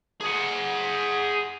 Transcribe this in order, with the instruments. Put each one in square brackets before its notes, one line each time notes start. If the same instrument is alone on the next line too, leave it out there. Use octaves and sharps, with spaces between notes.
[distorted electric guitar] G#4 F#5